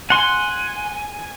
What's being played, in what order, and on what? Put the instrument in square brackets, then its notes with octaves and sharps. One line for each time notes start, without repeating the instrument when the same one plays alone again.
[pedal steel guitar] F#5 C6 [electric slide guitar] G#5